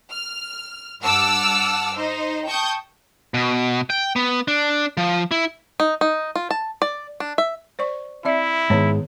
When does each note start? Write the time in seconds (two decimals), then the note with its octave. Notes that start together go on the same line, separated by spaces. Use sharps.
0.10 F6
1.03 G2 F#5 A5 D6 E6 F6
1.96 D#4 C5
2.46 G5 A5 C#6 D#6 G6
3.34 B2
3.90 G5
4.16 B3
4.48 D4
4.97 F3
5.31 E4
5.80 D#4
6.01 D#4
6.36 F4
6.51 A5
6.82 D5
7.20 D4
7.38 E5
7.79 C5 D5 C#6
8.25 C4 E4 D5 E5
8.70 G#2 D#3 G#3 B3 C#5